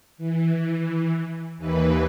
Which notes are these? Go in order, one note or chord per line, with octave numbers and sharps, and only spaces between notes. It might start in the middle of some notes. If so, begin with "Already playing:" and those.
E3
D#2 E3 B4